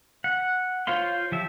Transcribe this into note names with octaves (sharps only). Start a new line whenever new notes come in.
F#5
F4 C5 C#5 F5 C6
F3 G4 E5